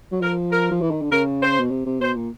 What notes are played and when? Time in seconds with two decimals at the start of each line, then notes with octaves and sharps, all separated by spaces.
0.12 F#3
0.21 F3 A#4
0.52 A#4
0.71 F3
0.81 E3
0.91 D#3
1.02 D3
1.11 C#3 A#4
1.41 C5
1.59 B2
1.71 C3
1.86 C3
2.01 B2 C5
2.16 A#2